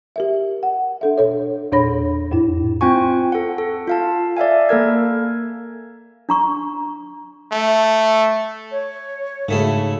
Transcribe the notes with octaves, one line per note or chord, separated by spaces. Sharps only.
G4 A#4 E5
F#5
D4 A4 E5
B2 A4 C#5
E2 A#2 D4 C#5 B5 A#6
F2 A2 E4
C4 F4 G5 G#5 C#6
A4 F#5
A4
F4 F5 A5
D5 E5 F5 G#5
A#3 A4 A#4 G#6
D4 A#5 C#6
A3
C#5
G#2 C#3 A3 E4 F#4